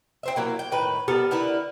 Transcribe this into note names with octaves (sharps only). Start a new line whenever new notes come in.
C4 C5 E5
F#3 A#3 E4
G5
A2 D#3 B4
G3 B3 A4 A#4
D3 E4 A#4 B4